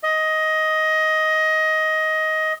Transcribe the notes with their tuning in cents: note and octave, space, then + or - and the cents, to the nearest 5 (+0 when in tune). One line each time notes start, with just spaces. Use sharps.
D#5 +15